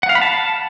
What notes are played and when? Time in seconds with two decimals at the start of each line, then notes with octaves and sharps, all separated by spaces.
0.03 F#5
0.09 F5
0.15 B5
0.21 A5